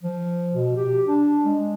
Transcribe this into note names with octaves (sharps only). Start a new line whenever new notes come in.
F3
B2
G4
D4
G#3